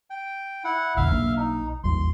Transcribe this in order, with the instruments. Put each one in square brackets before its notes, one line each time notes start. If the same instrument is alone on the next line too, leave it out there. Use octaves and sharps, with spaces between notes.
[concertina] G5
E4 F#5
[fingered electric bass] A#1 E2 D3 [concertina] E5 F5 F6
[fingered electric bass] B1 A#3 D4
[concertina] D#4
[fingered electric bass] A1 D#2 G3 [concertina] C6